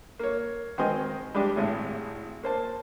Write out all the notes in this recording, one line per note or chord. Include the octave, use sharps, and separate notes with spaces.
A#3 C#5
D#3 G#3 C4 F#4 D#5 G#5
G3 G#3 D4 G4
G#1 A2 G#3
A#3 C5 A5